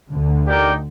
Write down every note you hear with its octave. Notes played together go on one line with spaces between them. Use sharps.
D2 D3
D#4 G4 A#4 D5 G5